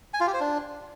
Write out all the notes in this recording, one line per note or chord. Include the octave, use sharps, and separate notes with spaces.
G#5
F4
G4
C5
D4